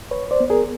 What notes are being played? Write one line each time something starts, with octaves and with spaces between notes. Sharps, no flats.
C#2 B4 C#5
C5 D5
B3
G#4 A#4